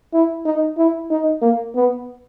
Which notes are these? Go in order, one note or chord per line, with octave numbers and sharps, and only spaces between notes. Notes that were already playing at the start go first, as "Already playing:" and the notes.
E4
D#4
E4
D#4
A#3
B3